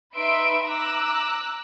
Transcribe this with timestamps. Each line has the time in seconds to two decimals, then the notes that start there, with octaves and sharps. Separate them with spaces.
0.15 D#4 B4 E5 B5 C6 D7
0.64 A#5 D6 E6 F#6